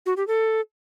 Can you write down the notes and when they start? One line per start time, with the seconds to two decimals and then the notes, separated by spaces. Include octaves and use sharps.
0.06 F#4
0.17 G4
0.27 A4